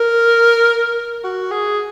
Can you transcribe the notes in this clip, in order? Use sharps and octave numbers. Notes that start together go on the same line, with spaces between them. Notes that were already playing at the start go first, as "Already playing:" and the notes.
Already playing: A#4
F#4
G#4